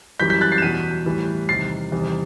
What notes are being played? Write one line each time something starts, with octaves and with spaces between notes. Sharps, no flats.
F#2 E3 G3 G6 B6
G6 B6
F#6 A6
A6 C7
E7
E2 B2 F#3 B6 D#7
A2 E3 G3
E2 C3 D#3 G3 A6 C7
E2 C3 D#3 G3